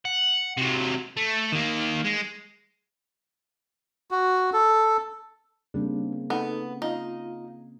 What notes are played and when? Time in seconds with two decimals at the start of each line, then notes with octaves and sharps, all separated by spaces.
0.05 F#5
0.57 C3 F#3
1.17 A3
1.52 D#3 A#3
2.05 G#3
4.11 F#4
4.53 A4
5.74 C#3 G3 A#3 C4 D4
6.30 B3 D#4 A4
6.82 D#4 F4 F5